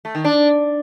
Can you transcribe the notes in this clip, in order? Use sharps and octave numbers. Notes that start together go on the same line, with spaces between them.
A3
D#3
D4